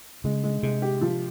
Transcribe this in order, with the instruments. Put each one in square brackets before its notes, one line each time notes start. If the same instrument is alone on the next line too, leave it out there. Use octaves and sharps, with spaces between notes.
[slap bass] C#3 [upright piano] G#3
[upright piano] G#3
[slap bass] C3 [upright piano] G#3
[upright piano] G4
F3